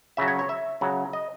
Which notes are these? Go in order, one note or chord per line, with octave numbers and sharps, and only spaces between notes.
C#3 F#3 E5
C#5
C#5
E5
C#3 F#3
D#5